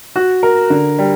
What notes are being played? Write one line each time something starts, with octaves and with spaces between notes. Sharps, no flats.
F#4
A#4
D3
G3